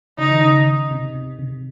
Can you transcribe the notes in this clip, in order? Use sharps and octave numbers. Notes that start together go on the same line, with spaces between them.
C#3 D#4
D#3
C#3
C3
C3
C3